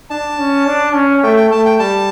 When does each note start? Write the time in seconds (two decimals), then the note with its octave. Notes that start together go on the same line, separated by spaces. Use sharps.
0.10 D4 A5
0.39 C#4
0.66 D4
0.94 C#4
1.23 A3 G5
1.37 G5
1.50 A3 A5
1.65 G5
1.79 G3 A5